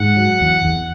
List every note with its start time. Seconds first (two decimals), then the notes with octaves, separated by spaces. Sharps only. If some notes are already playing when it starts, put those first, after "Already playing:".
Already playing: G#2 F#5
0.16 F#3
0.41 E2
0.65 E2